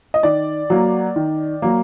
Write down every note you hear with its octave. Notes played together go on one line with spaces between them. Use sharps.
D#5
D#3 D5
F#3 A#3
D#3
F#3 A#3